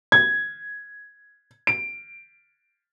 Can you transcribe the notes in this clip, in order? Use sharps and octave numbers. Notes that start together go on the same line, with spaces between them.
G#6
D7